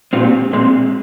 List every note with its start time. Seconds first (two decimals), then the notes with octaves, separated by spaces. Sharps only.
0.13 A#2 G#3 C4 F4
0.23 G4
0.53 A#2 G#3 C4